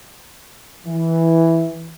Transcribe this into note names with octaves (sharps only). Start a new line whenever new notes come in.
E3